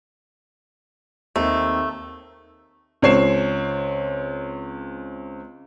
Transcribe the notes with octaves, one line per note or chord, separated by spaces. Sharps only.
D#2 A3 C4 D#4
C#2 C4 C#5 C7 E7